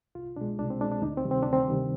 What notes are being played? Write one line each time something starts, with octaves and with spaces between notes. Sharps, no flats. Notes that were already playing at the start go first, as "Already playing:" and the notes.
C2 F4
B2 G#3 D4
C2 D4
C4
B2 G#3 D4
D4
D2 D#4
C4
C3 D#3 G3
C4
D2 D4
C4
C3 D#3 G3